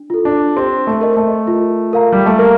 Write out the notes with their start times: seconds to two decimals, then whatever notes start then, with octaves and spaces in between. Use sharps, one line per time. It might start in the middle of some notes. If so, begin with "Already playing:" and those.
Already playing: D4
0.10 F4 A4
0.25 D4
0.56 C4 G4
0.87 A3
1.01 A#4 D#5
1.17 A3
1.47 F4
1.93 A#4 F5 A#5
2.12 G3
2.26 A3
2.39 A#3 A#4